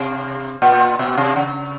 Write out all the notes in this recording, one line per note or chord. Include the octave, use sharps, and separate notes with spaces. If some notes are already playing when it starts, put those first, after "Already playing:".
Already playing: C3
A#2
B2
C3
C#3